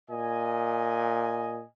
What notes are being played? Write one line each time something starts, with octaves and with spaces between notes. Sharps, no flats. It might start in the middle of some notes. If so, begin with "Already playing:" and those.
A#2 D#5 G#5